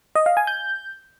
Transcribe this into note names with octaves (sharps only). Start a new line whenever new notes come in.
D#5
F5
G#5
G6